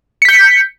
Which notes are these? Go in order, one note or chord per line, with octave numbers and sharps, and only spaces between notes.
G6 B6 C#7